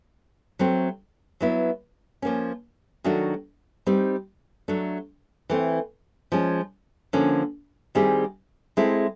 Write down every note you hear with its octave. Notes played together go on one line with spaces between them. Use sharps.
F#3 A3 C4
F#3 B3 E4
F3 A#3 C#4
D#3 F#3 A3 D4 F#4
G3 C4 D#4
F#3 A3 D4
E3 A3 C4
F3 G#3 C#4
D3 F3 A#3 C#4
D#3 G3 C4 E4 G#4
G#3 C4 E4 A4